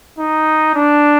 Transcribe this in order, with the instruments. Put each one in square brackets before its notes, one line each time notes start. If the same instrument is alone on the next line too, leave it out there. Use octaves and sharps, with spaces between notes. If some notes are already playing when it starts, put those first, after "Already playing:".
[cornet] D#4
D4